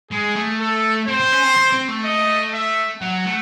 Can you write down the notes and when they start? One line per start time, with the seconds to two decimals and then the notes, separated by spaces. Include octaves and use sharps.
0.11 G#3 G#4
0.36 A3
0.60 A4
1.08 C4 C5
1.20 C4
1.32 C#4
1.44 C4
1.57 C4
1.73 C4
1.88 A3
2.05 D#5
2.54 E5
3.01 F#3 F#5
3.26 A3